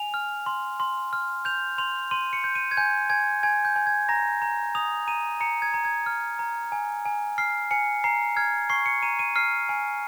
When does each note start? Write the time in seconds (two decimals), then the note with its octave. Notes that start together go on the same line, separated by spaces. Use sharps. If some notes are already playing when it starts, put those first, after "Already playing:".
Already playing: G#5 F7
0.14 F6
0.46 C6
0.80 C6
1.13 F6
1.45 G6 F7
1.78 C6 F7
2.11 C6 D#7
2.33 C#7
2.44 G6
2.55 D#7
2.71 G#6
2.77 G#5 G6
3.10 G#5 G#6
3.43 G#5 G#6
3.65 G6
3.76 G#5
3.87 G#6
4.09 A#5 A#6
4.42 A#5
4.75 D#6 F7
5.07 A#5 D#7
5.40 A#5 C#7
5.62 G#6
5.74 A#5
5.85 G#6
6.06 F6
6.39 A#5
6.72 G#5
7.05 G#5
7.38 F6 C7
7.71 G#5 C#7
8.04 A#5 C7
8.37 F6 G#6
8.70 C#6 C7
8.86 C#7
9.02 A#5 D#7
9.19 D#7
9.36 F6 C7
9.69 G#5